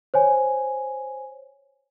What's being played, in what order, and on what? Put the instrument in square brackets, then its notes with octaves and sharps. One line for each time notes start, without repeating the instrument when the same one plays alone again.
[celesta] C5 C#5 G#5